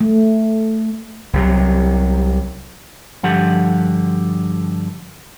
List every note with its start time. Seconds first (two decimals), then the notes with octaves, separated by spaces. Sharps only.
0.01 A3
1.33 C2 C3 F#3
3.23 G2 D3 F3 G4 F#5